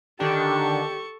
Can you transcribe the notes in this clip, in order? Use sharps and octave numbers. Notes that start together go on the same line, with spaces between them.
D3 D#3 D4 G4 A4 C#6